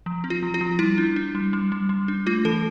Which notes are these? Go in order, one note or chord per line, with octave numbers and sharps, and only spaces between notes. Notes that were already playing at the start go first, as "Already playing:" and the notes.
F3
C4
F4
F3
F4
F3
G3 E4
D4
D4
G3
G3
G3
G3
D4
A3 F4
E3 A4